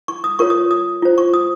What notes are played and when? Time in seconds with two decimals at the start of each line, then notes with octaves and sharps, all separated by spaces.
0.08 C#6
0.24 D#6
0.39 F4 A#4 C#5 C#6
0.50 D#6
0.71 D#6
1.02 F4 C5
1.18 C#6
1.34 D#6